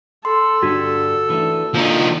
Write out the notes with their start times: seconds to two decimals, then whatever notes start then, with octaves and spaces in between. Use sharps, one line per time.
0.25 A4 C6
0.63 G2 D3 G3 F#4
1.30 E3 A3 D4
1.75 F3 A#3 D4 D#4